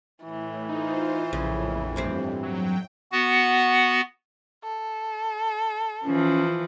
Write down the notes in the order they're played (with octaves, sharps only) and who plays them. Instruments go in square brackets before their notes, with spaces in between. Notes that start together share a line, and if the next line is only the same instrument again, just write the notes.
[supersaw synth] A2 [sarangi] E3
[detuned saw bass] D#4 [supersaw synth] F4 C5
[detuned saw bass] A#1 [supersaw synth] F2 A2 [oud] C#3
[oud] E2 G2 C4
[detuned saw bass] F#3 [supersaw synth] G5
[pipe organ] B3 F#4 F#5
[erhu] A4
[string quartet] E3 F3 [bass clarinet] C#4